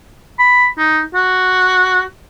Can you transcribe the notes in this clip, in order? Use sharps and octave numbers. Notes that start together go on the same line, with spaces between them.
B5
D#4
F#4